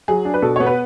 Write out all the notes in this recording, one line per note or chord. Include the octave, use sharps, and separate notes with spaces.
F#3 G#4
D4
B4
B2 A4
B3 C#5
B4